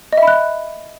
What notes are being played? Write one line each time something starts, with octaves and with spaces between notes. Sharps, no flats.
D#5 E5 B5 F#6